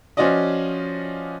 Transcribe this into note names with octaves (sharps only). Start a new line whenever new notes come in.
F3 C#4 F4 F#4 D5 D#5